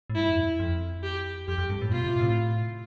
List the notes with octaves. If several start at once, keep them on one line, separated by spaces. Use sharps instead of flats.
A2
G2 E4
F2
E2
F2
G4
F2 G4
F2
G2
A2
B2 F4
C3
A2